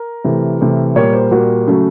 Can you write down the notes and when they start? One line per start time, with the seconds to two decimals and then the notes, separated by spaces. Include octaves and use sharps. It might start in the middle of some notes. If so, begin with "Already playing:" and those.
Already playing: A#4
0.24 C3 E3 A3
0.61 C3 E3 A3
0.96 A#2 G3 A#3 C#5
1.13 C5
1.31 A#2 G3 A#3 F#4
1.67 C#3 F#3 A3